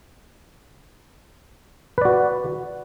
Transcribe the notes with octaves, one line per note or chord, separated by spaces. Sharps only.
F#4 B4 D5